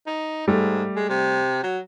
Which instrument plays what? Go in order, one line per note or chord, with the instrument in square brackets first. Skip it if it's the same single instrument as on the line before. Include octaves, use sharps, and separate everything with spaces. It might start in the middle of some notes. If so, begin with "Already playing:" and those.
[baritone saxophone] D#4
[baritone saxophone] G#2 [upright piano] G3 A3
[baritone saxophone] G#3
C3
F#3